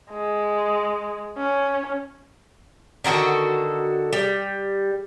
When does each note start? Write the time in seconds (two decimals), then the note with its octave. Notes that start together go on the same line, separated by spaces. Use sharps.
0.10 G#3
1.37 C#4
3.04 D3 D#3 F#4 A4
4.13 G3